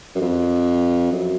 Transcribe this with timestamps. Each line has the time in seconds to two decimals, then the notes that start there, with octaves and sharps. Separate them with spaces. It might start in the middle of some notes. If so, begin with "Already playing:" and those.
0.15 F#2
0.21 F2
1.12 F#2